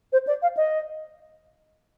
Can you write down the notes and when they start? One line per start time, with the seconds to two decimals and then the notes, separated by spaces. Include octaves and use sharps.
0.13 C5
0.27 D5
0.42 F5
0.57 D#5